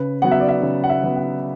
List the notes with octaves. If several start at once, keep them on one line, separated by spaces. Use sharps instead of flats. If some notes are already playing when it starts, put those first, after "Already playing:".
Already playing: C#3 B4
F#3 B3 F#5
E5
D5
E5
C#3
F#5
E5
F#3 B3
F#5